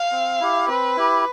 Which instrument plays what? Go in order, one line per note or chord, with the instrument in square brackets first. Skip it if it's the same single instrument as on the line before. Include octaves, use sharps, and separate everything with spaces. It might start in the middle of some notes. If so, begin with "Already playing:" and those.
Already playing: [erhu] F5
[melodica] C4
E4 G4
[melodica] C4 [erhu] B4
[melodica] E4 G4